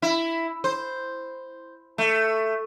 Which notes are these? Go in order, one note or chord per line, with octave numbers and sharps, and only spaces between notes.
E4
C5
A3